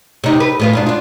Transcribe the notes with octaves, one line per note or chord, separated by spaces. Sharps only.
C3 D#4
B4
A2 B3 F4
G#2 B2 D4
D4 F4